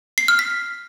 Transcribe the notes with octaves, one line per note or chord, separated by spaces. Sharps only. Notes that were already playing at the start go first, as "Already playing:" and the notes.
C7
F6
B6